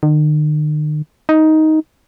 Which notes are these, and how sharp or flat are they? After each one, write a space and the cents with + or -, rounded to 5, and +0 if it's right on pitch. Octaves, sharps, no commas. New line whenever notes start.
D#3 -45
D#4 +10